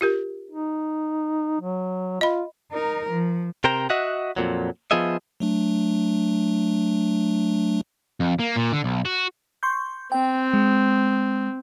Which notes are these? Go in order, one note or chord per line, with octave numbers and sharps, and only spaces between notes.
F4 G4 A#4
D#4
F#3
F4 D#5 B5
D#4 A#4
F3
C3 A#4 C5 G5 A#5
F#4 D#5 E5 F#5
F2 A#2 F#3
F3 B3 F4 G#4 D#5 E5
F#3 A3 D4
F2
A#3
A#2
D3
B1
F#4
C6 C#6 G6
C4 G5
G#3